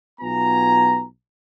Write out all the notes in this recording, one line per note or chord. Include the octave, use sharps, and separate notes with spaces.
B1 B3 F4 G#5 A#5